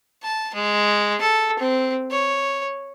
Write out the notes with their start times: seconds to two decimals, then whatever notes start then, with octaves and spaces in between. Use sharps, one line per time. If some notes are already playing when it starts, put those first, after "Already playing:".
0.23 A5
0.54 G#3
1.21 A4
1.59 C4
2.11 C#5